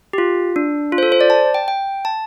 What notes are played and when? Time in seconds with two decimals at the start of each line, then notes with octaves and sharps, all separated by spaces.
0.13 G4
0.18 F4
0.56 D4
0.92 F4
0.98 C5
1.03 A4
1.12 C5
1.21 D5
1.30 A5
1.54 G5
1.68 G5
2.05 A5